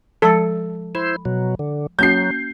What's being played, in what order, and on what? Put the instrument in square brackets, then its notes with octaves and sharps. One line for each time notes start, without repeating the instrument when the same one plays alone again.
[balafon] F3 G#3 A5 [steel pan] A4
[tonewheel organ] E4 C5 [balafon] B5
[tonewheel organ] B2 F#3
D3
[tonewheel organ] F#3 [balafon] A#3 C#4 F#4 [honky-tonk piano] G6 C7